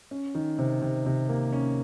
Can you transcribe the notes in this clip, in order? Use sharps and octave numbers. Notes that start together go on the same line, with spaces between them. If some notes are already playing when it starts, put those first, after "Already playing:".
C#4
D#3
C3
C3
C3
A#3
C#4